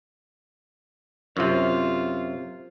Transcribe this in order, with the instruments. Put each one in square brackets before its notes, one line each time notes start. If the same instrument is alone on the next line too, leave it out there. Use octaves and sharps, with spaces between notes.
[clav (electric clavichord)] F#2 C3 [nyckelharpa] F4